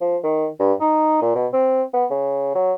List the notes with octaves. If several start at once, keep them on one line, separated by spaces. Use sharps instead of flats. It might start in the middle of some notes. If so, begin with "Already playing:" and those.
F3
D#3
G2
D#4
A#2
B2
C4
B3
C#3
F#3